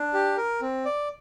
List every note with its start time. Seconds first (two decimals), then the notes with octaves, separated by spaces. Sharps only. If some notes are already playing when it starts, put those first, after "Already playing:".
Already playing: D4
0.14 G4
0.37 A#4
0.61 C4
0.85 D5